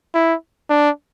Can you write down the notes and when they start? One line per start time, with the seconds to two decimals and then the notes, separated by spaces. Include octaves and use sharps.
0.14 E4
0.70 D4